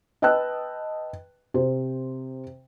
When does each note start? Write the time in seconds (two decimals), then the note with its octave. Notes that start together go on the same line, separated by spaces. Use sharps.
0.22 B4 D#5 G5 A5 E6 F#6
1.54 C3 C5